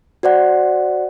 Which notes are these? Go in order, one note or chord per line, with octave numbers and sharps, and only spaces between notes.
F#4 C5 D5 F#5